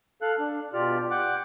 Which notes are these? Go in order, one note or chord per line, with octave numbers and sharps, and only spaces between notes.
A4 F5 F#6
D4
B2 F4 G4 D5 F6
F#5 G5 D6 F#6